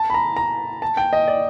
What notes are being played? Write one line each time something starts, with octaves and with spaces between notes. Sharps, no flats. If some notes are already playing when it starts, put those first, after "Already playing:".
Already playing: A5
B5
A#5
A#5
A5
G5
D#5
D5